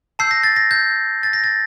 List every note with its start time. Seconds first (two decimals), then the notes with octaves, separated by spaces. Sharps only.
0.19 A5 E6 G6 C7
0.31 A#6
0.43 A6
0.56 A#6
0.71 G6
1.23 A6
1.33 A#6
1.44 A6